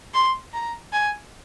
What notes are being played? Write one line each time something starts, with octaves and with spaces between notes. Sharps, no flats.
C6
A#5
G#5